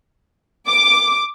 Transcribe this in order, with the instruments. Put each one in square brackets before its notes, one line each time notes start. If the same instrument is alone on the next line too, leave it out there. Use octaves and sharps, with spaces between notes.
[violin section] D6